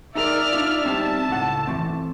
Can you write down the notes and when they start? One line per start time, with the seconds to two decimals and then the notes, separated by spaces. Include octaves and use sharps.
0.15 D#4 G#4 A#4 D5 E5 F6
0.52 D4 D#4 F4
0.85 G3 C4 D#4 A5
1.29 C#2 A2 F#5
1.67 E3 A3 C4